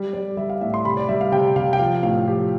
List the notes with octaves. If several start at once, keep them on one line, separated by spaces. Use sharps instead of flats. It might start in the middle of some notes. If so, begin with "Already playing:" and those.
Already playing: G3
G3 D5
G3 E5
F5
A2 E5
C6
C3 B5
D5
G3 E5
F5
C3 G5
C3 F5
G5
F3 F5
A2 F5
F3 G4